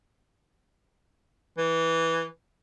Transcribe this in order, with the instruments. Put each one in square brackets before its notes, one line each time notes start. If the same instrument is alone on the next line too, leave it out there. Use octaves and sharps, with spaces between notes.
[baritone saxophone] E3